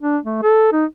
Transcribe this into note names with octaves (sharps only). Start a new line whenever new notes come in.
D4
A3
A4
D#4